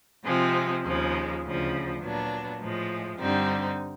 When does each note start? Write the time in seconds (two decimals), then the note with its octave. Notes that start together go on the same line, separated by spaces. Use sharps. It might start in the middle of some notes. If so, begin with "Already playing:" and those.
0.24 C3 F3 G#3 C4
0.83 D#2 C#3 F3 G#3
1.42 D2 C#3 F3
2.01 A#2 F#3 B3 D4
2.60 A2 F3 G#3
3.18 G2 D3 G3 C4 D#4